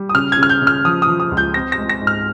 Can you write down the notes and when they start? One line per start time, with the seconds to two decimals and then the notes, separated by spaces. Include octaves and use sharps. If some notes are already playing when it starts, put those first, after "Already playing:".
Already playing: G3
0.09 D#6
0.14 C#3 F6
0.32 G#6
0.38 C#3
0.43 F6
0.49 G6
0.62 C#3
0.67 F6
0.85 F3 D#6
1.02 D#6
1.08 F3
1.20 D#6
1.32 C#2
1.37 G6
1.54 C4 A#6
1.72 A#6
1.78 G#3
1.89 A#6
2.01 G#2
2.07 F6